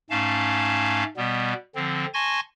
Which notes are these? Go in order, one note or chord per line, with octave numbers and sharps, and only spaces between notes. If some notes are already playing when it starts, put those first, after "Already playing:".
G#2 A3 C#4 F5 A5
B2 G3 B3
D3 F3 C4
G#5 A5 C6 C#6 G#6 A#6